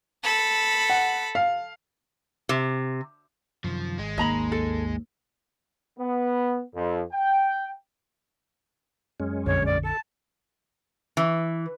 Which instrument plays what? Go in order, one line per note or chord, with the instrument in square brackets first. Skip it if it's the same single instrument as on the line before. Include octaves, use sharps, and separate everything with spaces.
[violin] A4 B5
[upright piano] F#5
F5
[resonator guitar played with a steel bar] C3
[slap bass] F#2 C3 D#3 [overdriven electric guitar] F3
[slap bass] G#1 [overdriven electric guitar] G#3
[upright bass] D#2 [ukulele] D#5 A#5 B5
[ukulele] A4
[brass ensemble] B3
F2
G5
[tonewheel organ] F#2 G#3 C#4
[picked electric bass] A#1 F2 D3 [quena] C#5
[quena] D5
[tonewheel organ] A4 [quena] A5
[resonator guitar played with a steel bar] E3